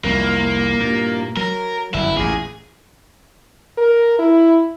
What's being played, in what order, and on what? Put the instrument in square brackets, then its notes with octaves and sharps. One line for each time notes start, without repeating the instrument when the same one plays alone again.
[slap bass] C2 F2 [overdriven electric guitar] A#3
[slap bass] G2 A#2
[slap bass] F#3 [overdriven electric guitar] A#4
[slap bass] G1 F#2 [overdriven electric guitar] E4
[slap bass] A1 E2 A#2 [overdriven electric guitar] G#4
[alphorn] A#4
E4